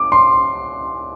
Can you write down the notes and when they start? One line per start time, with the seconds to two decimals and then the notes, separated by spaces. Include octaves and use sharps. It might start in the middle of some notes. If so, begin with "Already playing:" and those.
Already playing: D6
0.12 C6